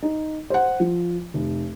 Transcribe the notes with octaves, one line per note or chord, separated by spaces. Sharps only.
D#4
C5 F#5
F3
F1